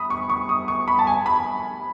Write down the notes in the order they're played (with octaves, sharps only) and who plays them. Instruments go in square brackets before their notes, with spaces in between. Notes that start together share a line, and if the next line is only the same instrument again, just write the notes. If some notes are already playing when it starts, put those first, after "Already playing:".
Already playing: [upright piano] B5 D#6
C#6
C#6
D#6
C#6
B5
A5
G#5
B5